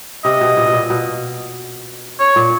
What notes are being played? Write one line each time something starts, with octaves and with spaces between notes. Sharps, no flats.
C3 D#5
B2
A#2
B2
A#2
B2
C#5
A#2